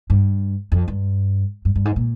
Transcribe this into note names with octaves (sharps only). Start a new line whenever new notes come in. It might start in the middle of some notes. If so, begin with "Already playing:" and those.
G2
F2
G2
G2
G2
G#2
A#2